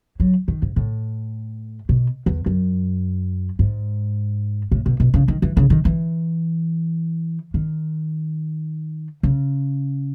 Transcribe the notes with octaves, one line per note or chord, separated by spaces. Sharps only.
F#3
D#3
G#2
A2
B2
E2
F#2
G#2
A2
B2
B2
C#3
D#3
E3
C#3
D#3
E3
D#3
C#3